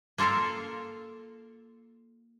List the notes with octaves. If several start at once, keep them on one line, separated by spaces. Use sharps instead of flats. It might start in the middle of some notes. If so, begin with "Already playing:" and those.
A#3 F4 A4 A#4 F5